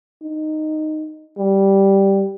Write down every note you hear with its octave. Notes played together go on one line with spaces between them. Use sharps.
D#4
G3